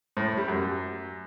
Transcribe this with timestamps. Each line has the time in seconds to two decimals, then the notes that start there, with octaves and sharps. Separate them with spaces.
0.17 A2
0.27 A2
0.38 G3
0.48 F#2